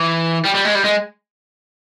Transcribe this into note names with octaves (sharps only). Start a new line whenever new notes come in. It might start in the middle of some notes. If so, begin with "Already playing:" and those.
Already playing: E3
G3
G3
G#3
G3
G#3